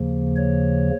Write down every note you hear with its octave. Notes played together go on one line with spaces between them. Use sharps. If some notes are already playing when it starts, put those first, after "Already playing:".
Already playing: D#2 C#3 F3 A#3
C#5